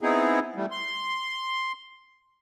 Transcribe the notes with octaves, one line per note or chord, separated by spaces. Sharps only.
B3 C4 D#4 E4 G#4
E3 G3 A3
C6